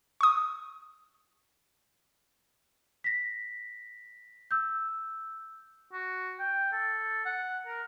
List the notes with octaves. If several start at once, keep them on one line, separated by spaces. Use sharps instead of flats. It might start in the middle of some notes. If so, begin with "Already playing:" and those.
C#6 D#6
A#6 B6
E6 G6
F#4
G5
A4
F#5
A#4